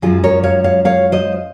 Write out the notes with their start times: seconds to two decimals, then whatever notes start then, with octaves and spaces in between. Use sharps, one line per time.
0.02 F#2 F3 G#3 F4 G#4
0.24 A#4 C#5
0.44 C#5 F5
0.64 C#5 F5
0.85 C#5 F5
1.12 C5 D#5